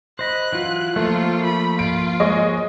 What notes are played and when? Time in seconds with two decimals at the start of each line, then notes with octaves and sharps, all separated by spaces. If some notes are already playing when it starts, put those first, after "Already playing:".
0.19 C5 D#5 B5 F#6
0.53 E3 F#3 F4
0.96 F3 A3 A#3 F4
1.44 B5
1.79 F4 D7
2.20 G#3 C#5 D#5